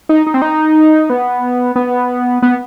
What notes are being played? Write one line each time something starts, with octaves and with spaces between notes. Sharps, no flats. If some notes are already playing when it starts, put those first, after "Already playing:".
D#4
D#4
C4
D#4
B3
B3
B3